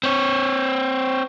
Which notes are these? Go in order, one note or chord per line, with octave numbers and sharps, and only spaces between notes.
C4 C#5